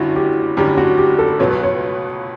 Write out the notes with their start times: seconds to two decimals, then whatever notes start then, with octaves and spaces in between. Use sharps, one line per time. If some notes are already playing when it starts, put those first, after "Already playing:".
Already playing: G1 F#2 D3 G3 C#4 E4 F#4
0.16 G4
0.57 G1 F#2 D3 G3 C#4 G4
0.78 F#4
0.98 G4
1.19 A4
1.39 C#2 B2 F#3 B3 C#5
1.51 B4
1.63 C#5